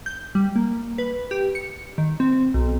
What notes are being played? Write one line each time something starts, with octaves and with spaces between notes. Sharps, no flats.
G6
G3
A#3
B4
G4
C#7
D#3
C4
B1